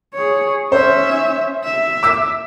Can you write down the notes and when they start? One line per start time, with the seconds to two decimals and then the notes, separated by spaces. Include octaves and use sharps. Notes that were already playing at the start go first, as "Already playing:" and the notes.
0.14 G#4 C#5
0.72 C#4 C5 E5
1.64 E5
2.03 D6 E6 B6